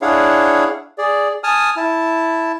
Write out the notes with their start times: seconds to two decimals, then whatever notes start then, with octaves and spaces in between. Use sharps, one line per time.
0.02 D4 E4 G#4 C#5 F5 F#5
0.98 G#4 D5
1.44 G#5 A5 D#6 F6
1.77 E4 A5